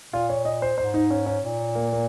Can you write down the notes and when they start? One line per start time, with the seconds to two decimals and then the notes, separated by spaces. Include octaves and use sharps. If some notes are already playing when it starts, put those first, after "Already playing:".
0.13 A#2 F4
0.29 C#5
0.45 D#5
0.62 C5
0.78 G#2 C5
0.94 D#4
1.10 C#4
1.26 C#4
1.42 A#2
1.75 A#3
1.93 A#3